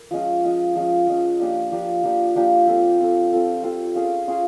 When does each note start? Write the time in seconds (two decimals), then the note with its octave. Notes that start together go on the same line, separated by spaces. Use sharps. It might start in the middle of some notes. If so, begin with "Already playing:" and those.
Already playing: A#4
0.11 F3 G#3 C#4
0.44 F3 G#3 C#4
0.75 F3 G#3 C#4
1.07 F3 G#3 C#4
1.40 F3 A#3 D4 G4
1.72 F3 A#3 D4 G4
2.04 F3 A#3 D4 G4
2.36 F3 A#3 D4 G4
2.68 C4 F4 A4
2.99 C4 F4 A4
3.32 C4 F4 A4
3.63 C4 F4 A4
3.95 C#4 F4 G#4
4.27 C#4 F4 G#4